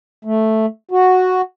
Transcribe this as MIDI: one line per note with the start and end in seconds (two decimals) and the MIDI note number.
0.25 0.66 57
0.91 1.41 66